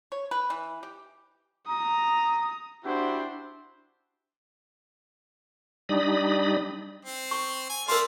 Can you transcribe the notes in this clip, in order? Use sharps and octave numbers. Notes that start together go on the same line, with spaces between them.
C#5
B4
E3
G4
A#5 D#6
D4 E4 F#4 G4 C5
G3 D4 D#4 B5 D#6
C4
C#6
G#5
A3 A#4 D5 F5 C6